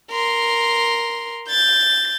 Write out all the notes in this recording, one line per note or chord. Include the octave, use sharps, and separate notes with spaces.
A#4 C6
G6 A6